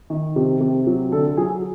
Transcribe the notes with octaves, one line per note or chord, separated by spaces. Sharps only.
D#3
C3
C3
F#3
D3 A4
F#3 G#4